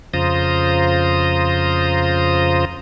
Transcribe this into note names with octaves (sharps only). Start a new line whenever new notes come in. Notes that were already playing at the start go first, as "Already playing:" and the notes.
F2 C#3 F4 C5 A#5 D#6